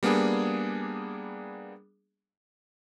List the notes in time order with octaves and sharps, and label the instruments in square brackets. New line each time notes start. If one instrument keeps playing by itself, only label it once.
[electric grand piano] G3 A#3 B3 D4 G#4